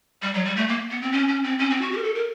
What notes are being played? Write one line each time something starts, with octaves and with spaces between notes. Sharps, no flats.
G3
F#3
G3
A3
A#3
B3
C4
C#4
C#4
C4
C#4
C4
F#4
G4
A#4
A4
A#4